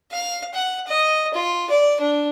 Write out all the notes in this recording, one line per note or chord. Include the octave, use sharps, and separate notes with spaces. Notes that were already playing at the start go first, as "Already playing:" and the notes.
F5
F#5
D#5
F4
D5
D4